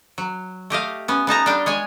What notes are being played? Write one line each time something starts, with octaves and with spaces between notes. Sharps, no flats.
F#3
A3 G4 D#5 F5
B3 C#4
B3 D#4 A5 A#5
G3 D4 F5 G5
G#3 C#5 G#5